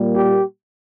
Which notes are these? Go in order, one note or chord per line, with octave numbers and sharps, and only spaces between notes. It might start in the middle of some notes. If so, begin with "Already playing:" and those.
Already playing: A#2 G3 A#3
G4